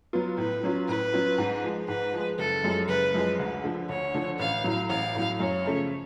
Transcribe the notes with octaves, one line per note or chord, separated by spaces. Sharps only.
F#3 B3 F4
A2 B4
F#3 C#4 F4
A2 B4
F#3 C#4 F4
G#2
F3 G#3
G#2 B4
F3 G#3
F#1 A4
F#2 F3 G#3
F#1 B4
F#2 F3 G#3
D2
D3 F3
D2 C#5
D3 F3
A1 F5
A2 F#3
A1 F5
A2 F#3
F#2 C#5
C#3 F3 A3 C#4